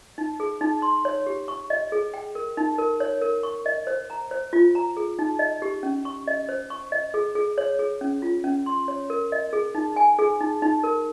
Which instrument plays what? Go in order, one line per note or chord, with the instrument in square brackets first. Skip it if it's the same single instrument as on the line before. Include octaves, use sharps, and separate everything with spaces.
[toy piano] D#4
G#4
D#4
C6
C#5
G4
C#6
D#5
G#4
G5
A#4
D#4
A#4
C#5
A#4
C#6
D#5
C5
A#5
C5
F4
A#5
G#4
D#4
D#5
G4
C#4
C#6
D#5
C5
C#6
D#5
G#4
G#4
C#5
G#4
C#4
F4
C#4
C6
C#5
A#4
D#5
G#4
D#4
G#5
G#4
D#4
D#4
A#4